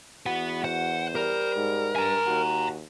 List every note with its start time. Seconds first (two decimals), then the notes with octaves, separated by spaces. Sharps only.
0.26 E2 F#4 B4 F#5
0.64 C5 F#5
1.15 G3 A#4
1.56 G#2
1.96 G2 G#5 A#5
2.27 D#2 F#4